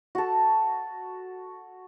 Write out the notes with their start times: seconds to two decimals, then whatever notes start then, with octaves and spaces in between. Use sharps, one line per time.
0.15 F#4 A4